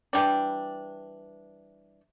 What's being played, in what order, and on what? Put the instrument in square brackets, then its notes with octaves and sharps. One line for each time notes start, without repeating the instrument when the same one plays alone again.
[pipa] E3 G3 D4